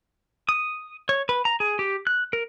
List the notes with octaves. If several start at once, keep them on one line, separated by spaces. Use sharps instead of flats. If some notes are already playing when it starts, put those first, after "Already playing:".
D#6
C#5
B4
A#5
G#4
G4
F#6
A#4